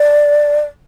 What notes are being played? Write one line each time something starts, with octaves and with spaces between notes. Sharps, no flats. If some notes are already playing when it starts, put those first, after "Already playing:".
Already playing: D5